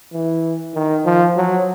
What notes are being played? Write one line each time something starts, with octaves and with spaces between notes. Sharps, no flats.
E3
D#3
F3
F#3